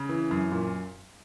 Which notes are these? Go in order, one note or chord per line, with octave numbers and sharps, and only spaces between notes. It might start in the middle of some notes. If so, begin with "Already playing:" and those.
Already playing: C#3
E3
F#2
A#2